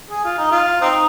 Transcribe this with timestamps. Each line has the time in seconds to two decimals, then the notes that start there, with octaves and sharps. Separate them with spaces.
0.11 G#4
0.25 F4
0.38 D#4
0.51 F4
0.81 C4 D#4